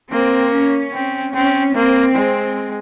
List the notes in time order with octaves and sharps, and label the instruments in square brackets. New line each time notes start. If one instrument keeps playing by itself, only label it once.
[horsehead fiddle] A#3 [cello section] C4
[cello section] C#4
[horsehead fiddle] C4
[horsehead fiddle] C4 [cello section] C#4
[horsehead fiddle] A#3 [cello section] C4
[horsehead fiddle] G#3